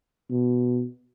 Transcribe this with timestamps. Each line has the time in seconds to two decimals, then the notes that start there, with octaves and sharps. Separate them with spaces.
0.30 B2